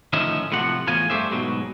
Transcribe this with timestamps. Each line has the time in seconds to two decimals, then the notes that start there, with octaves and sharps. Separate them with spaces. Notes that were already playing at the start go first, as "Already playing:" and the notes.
0.13 A2 D#3 F3 C#4 D#4 E5
0.52 A2 C3 F3 F#5
0.87 E2 A2 F3 F4 G#5
1.10 G2 A3 G4 C5 E5
1.31 G#2 B2 F#3